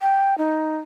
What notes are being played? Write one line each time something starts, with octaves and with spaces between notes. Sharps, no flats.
G5
D#4